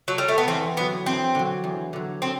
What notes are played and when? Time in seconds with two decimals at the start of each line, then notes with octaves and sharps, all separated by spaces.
0.08 F#3
0.18 G3
0.28 A3
0.38 B3
0.48 E2 C4
0.77 D3 F#3 B3
1.06 E2 C4
1.35 D3 F#3
1.64 E2
1.93 D3 F#3
2.22 C4